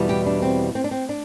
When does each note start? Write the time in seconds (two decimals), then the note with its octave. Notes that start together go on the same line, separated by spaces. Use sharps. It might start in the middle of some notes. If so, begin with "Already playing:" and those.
Already playing: E2 B2 G3 B3
0.09 G4
0.26 D4
0.42 C4
0.75 C4
0.84 D4
0.91 C4
1.09 D4